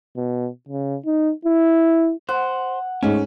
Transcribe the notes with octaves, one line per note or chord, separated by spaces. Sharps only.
B2
C#3
D#4
E4
C5 F#5
G#2 A3 C#4